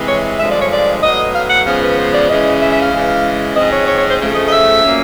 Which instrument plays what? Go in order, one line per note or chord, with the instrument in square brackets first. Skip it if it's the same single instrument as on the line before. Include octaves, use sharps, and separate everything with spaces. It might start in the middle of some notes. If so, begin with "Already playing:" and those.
Already playing: [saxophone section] C3 E3 G#3
C#5
G2 D3 F3 G#3 E5
D5
C#5
D5
A2 F#3 B3 D#5
F5
F#5
C#3 F3 G#3 B3 F5
B4
C5
D5
C#3 E3 G#3 C#4 D#5
E5
E5
F5
C#3 E3 G#3
G#2 F3 G#3 C4 D#5
C#5
C#5
C#5
C5
C#3 F3 A3
D#5
D#5
E5
A#2 F#3 A#3 C#4